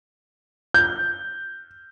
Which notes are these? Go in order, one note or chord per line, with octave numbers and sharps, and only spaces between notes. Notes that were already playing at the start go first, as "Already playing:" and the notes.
G6